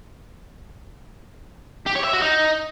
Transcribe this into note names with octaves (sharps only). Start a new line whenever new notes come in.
G4
C#5
E5
F#4
D#4